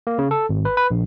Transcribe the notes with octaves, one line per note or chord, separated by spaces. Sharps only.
A#3
C#3
A4
G#1
B4
B4
A#1